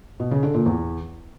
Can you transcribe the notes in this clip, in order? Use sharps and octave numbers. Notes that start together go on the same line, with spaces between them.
B2
C#3
D3
A#2
E2